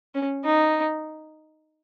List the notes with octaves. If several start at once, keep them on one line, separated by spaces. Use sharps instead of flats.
C#4
D#4